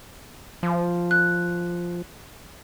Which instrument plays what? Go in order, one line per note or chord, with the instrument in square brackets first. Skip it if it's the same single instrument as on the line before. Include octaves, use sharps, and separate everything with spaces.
[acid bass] F3
[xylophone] F#6